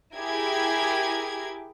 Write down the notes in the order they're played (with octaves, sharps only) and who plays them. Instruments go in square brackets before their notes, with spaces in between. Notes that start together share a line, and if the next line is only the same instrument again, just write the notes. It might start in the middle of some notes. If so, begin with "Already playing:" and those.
[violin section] E4 G4 G#4 A#4 G#6